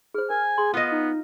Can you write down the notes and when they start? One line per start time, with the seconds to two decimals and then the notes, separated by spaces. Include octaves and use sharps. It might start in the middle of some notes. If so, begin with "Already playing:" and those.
0.14 G#4 C5 F6
0.30 A#4 G#5
0.58 G#4 C6
0.74 B3 F4 D#5 F#5
0.91 D#4